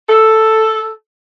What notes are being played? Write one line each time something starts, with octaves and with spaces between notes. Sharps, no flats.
A4